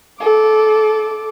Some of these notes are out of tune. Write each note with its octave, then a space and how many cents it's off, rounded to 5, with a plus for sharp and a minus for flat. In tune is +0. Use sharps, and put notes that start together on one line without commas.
A4 -25 D6 +0